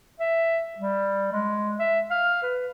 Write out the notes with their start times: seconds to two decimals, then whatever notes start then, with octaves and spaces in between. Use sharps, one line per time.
0.20 E5
0.78 G3
1.32 G#3
1.79 E5
2.10 F5
2.43 B4